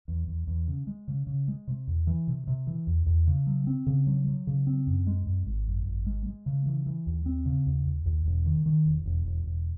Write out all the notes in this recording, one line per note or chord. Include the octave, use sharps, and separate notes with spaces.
E2
E2
E2
C#3
G#3
C#3
C#3
G#3
C3
E2
E3
C3
C3
E3
E2
E2
C#3
F#3
C4
C#3
F#3
F#3
C#3
C4
F#2
G#3
F#2
G#1
F#2
G#1
G#3
G#3
C#3
E3
E3
D#2
C4
C#3
D#2
D#2
D#2
E1
D#3
D#3
E1
E1
E1
E1